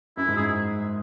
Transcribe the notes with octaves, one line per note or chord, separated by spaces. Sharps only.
F#2 E4
G#2
G#4